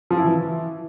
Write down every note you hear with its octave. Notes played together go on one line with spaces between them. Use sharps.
F3
E4
E3